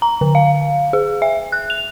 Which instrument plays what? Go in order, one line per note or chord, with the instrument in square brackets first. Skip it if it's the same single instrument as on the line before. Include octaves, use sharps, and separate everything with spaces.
[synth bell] A#5
D3
F5
G#4
E5
F#6
F7